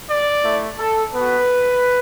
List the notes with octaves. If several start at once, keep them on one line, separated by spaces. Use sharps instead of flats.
D5
A3 E4
A4
B3 F#4 B4